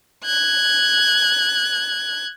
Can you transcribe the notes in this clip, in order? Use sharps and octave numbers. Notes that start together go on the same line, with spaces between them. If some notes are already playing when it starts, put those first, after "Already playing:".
F#6 G#6